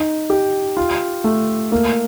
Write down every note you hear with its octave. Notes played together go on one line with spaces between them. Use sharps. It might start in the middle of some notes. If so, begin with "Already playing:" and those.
Already playing: D#4
G4
F4
A3
A#3